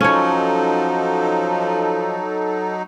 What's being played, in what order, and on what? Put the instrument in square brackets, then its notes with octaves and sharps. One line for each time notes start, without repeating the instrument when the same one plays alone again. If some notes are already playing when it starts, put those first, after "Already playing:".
[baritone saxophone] F3 [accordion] F#3 D#4 [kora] C#4 C#5 [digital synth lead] A4